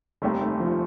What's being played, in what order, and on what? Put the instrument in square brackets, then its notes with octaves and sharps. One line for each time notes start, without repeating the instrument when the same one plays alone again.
[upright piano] F1 D#2 D#3 G3 C4 [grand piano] A3
[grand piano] A3
F3